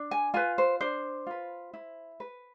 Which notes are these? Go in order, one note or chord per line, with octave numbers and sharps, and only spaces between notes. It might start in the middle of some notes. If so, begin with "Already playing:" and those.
Already playing: D4
G#5
F4 B4 G#5
C5
D4 C5
F4 B4
E4
B4